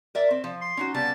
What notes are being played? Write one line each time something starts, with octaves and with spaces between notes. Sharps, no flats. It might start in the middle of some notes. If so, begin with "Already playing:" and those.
A#4 D5 E5
C4
F3
C6
C#4 D#4 F#4
C#3 G3 B3 A5